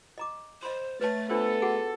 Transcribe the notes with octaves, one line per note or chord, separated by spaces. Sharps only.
D#5 A#5 D6
C5 D#5 B5 C6
A3 B4 C#5 A5 A6
B3 D4 F4 A4 C5
F#4 G#4 F#5